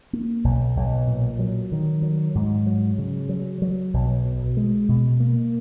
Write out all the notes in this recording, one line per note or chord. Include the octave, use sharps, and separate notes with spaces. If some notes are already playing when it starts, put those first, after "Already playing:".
A#3
B1
B1
A#2
F#3
D#3
F#3
G#2
F#3
C#3
F#3
F#3
B1
B2
G#3
B2
A#3